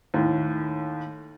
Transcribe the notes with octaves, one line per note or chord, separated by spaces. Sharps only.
D#2 A2